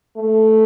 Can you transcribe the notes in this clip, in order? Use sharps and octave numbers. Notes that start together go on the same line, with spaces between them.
A3